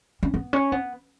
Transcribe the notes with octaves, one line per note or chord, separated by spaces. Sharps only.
C#4
B3
C#4
B3